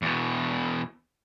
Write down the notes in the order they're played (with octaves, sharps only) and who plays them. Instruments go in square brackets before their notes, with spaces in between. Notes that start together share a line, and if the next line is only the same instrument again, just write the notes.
[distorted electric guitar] E2 B2